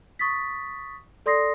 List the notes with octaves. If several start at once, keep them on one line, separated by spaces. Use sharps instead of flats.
C#6 D#6 A6 B6
A4 D5 C6 D#6 A#6 C7